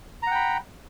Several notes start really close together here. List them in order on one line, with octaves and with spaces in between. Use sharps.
A#5 F#5 G5 B5